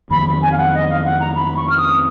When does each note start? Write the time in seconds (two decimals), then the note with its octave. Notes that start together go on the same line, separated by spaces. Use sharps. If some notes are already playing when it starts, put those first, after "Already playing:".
0.10 F2 D#3 F#3 A#3 B5
0.42 G#5
0.52 F5
0.58 F#5
0.74 D#5
0.89 F5
1.05 F#5
1.20 A#5
1.36 B5
1.57 C#6
1.70 F6
1.77 D#6